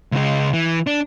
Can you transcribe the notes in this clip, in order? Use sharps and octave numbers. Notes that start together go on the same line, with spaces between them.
C#2 G#3
E3
D4